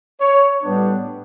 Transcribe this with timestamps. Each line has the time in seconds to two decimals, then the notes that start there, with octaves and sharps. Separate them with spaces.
0.20 C#5
0.63 A2 G3 B3 D4